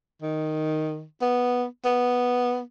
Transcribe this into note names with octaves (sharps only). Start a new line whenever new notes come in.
D#3
B3
B3